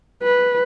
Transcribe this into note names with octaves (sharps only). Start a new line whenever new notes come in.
B4